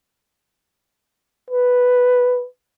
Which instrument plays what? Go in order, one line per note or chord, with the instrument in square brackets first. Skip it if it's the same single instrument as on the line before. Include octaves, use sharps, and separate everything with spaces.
[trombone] B4